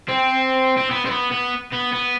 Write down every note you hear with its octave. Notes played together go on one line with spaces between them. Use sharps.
C4
C4
B3
C4
B3
B3
B3
B3